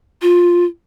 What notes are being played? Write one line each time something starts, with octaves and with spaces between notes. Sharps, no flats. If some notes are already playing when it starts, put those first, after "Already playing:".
F4